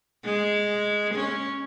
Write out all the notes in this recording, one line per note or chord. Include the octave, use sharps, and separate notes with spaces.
G#3
C#4